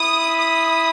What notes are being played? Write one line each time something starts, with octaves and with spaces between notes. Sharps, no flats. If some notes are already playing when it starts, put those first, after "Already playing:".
Already playing: E4 D#6
D#6